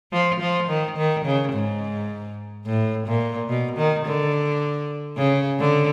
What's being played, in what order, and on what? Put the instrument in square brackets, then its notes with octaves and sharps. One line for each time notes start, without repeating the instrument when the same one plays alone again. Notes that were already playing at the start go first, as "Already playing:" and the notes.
[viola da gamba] F3
F3
D#3
D#3
C#3
G#2
A2
A#2
B2
D#3
D3
C#3
D3